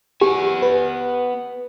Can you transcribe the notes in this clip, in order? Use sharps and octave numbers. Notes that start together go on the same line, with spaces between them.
B3 G4 G#5
B4